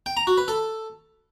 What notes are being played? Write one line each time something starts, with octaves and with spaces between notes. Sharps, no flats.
G5
A#5
F#4
B4
A4